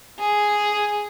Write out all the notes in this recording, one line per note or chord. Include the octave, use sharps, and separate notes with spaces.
G#4